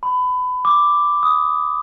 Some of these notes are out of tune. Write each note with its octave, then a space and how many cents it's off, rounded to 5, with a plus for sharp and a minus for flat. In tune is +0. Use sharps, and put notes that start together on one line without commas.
B5 +25
D6 +0
D#6 +10